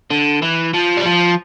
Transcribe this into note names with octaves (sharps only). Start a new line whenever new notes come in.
D3
E3
F3
G3
F3